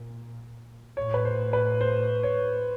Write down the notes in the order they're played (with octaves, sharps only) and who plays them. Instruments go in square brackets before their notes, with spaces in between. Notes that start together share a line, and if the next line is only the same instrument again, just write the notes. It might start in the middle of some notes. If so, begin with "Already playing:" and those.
Already playing: [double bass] A#2
[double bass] A2 [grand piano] C#5
[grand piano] B4
C5
B4
C5
C#5